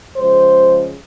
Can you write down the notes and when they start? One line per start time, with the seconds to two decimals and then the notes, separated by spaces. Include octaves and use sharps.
0.17 C#3 F3 G#3 C5